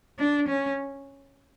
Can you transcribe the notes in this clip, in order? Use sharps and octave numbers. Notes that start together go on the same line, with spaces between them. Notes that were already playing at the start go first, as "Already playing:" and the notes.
D4
C#4